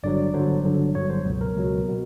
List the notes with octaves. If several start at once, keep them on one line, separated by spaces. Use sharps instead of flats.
G1 G2 D3 F#3 D5
G1 G2 D3 F#3 C5
G1 G2 D3 F#3
G1 G2 D3 F#3 C#5
C5
C#2 B2 F#3
A#4
C#2 B2 F#3
B2